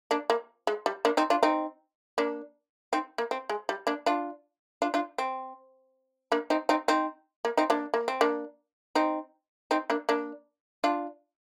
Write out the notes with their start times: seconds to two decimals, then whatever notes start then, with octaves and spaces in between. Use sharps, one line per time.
0.11 A#3 D4
0.30 A#3
0.67 G#3
0.86 G3
1.05 A#3 D4
1.17 C4 D#4
1.30 D4 F4
1.43 C4 D#4
2.18 A#3 D4
2.93 C4 D#4
3.18 A#3
3.31 C4
3.50 G#3
3.69 G3
3.87 A#3 D4
4.06 D4 F4
4.82 D4 F4
4.94 D4 F4
5.18 C4
6.32 A#3 D4
6.50 C4 D#4
6.69 C4 D#4
6.88 C4 D#4
7.45 A#3
7.57 C4 D#4
7.70 A#3 D4
7.94 A#3
8.08 C4
8.21 A#3 D4
8.95 C4 D#4
9.71 C4 D#4
9.90 A#3 D4
10.09 A#3 D4
10.84 D4 F4